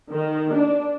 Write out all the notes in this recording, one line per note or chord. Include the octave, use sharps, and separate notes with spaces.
D#3
D4